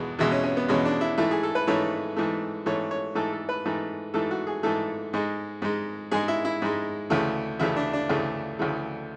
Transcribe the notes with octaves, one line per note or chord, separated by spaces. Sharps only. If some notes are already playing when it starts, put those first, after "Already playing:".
Already playing: E2 B2 G#3 F#4
E2 B2 G#3 E4
C#4
C#4
B3
E2 B2 G#3 C#4
D4
E4
G#2 E3 A3 E4
G#4
A4
B4
G#2 E3 A3 C#5
G#2 E3 A3
G#2 E3 A3 C#5
C#5
G#2 E3 A3 A4
A4
B4
G#2 E3 A3
G#2 E3 A3 A4
F#4
G#4
G#2 E3 A3 A4
G#2 G#3
G#2 G#3
G#2 G#3 G#4
E4
E4
G#2 G#3
D2 C#3 E3 A3
D2 C#3 E3 A3 E4
D4
D4
D2 C#3 E3 A3
D2 C#3 E3 A3